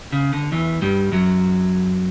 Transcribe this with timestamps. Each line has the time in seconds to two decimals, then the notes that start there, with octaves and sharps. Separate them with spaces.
0.13 C#3
0.33 D3
0.52 E2 E3
0.82 G2 G3
1.12 F#2 F#3